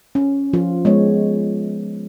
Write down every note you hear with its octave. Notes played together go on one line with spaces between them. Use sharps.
C#4
F3 F4
G#3 B3 C#5